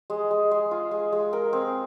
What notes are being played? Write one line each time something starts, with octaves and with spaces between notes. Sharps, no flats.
G#3
G#3
G#3
F4
G#3
G#3
A#4
C4